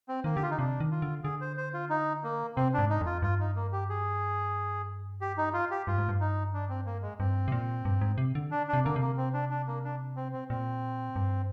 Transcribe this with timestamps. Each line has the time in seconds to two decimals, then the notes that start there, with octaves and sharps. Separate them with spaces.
0.09 C4
0.24 D#3 A#3
0.36 D3 G4
0.43 F4
0.51 D#4
0.58 C3 D4
0.80 D#3
0.91 F4
1.02 D3
1.24 D3 G#4
1.41 C5
1.57 C5
1.74 F4
1.90 D#4
2.23 A#3
2.57 C3 C4
2.74 G#2 D4
2.90 D#4
3.01 F2 F4
3.22 G2 F4
3.40 D#4
3.55 A#3
3.72 G4
3.89 G#4
5.21 G4
5.38 D#4
5.53 F4
5.71 G4
5.87 G2 F4
5.98 G#2
6.09 G2
6.20 D#4
6.54 D4
6.69 C4
6.86 A#3
7.02 G#3
7.19 G2 C4
7.48 C3
7.52 A#2
7.85 G2
8.01 G#2
8.18 C3
8.35 D3
8.51 D4
8.68 D4
8.73 C3
8.84 D3 A#3
8.96 C3 A#3
9.17 C4
9.33 D4
9.50 D4
9.67 A#3
9.84 D4
10.16 C4
10.33 C4
10.49 A#2 C4
11.16 G2